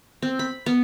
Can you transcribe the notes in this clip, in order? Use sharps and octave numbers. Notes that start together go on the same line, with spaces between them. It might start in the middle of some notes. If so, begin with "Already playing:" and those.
C4
B5
B3